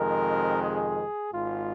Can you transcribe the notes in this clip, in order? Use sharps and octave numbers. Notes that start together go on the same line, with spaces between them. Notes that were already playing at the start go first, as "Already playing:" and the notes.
Already playing: F2 C3 D#3 G#3 A#4
G#4
G#1 G#2 G#3 F4